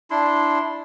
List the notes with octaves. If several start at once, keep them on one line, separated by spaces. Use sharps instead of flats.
D4 E4 C6